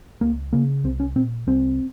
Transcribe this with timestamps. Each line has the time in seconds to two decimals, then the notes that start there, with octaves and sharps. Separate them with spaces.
0.21 C#2 A#3
0.53 C#3 A#3
0.84 C2 C4
1.00 C#4
1.16 A#2 C4
1.47 C2 C4